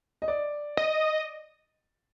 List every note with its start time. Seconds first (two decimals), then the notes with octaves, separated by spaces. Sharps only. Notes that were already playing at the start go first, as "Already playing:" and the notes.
0.22 D#5
0.28 D5
0.77 D#5